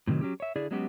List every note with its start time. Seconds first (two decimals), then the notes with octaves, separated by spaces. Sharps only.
0.07 A2 C3 D#3 F#3
0.21 F#3 C#4 G4
0.40 C#5 E5
0.56 D3 E4 G#4 D5
0.71 F#3 G#3 B3 C#4 F#4 G4